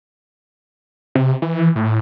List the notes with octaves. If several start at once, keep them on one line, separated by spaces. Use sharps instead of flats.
C3
E3
A2